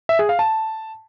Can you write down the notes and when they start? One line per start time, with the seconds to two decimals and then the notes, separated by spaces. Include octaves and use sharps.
0.09 E5
0.19 G#4
0.29 F5
0.39 A5